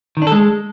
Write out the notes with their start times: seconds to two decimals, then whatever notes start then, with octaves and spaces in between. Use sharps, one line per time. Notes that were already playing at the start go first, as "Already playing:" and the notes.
0.17 D#3
0.22 D4
0.27 A4
0.32 G#3